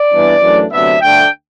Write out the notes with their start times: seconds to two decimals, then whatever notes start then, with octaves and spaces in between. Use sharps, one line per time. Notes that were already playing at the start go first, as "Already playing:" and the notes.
Already playing: D5
0.11 G2 E3 B3 D4
0.41 F#2 E3 A3 D4
0.71 D2 C3 F#3 B3 D4 E5
1.01 D2 D3 A3 D4 G5